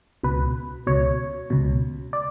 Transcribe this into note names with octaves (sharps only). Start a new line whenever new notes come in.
C#2 B2 B4
C#2 B2 C#5
C#2 B2
D5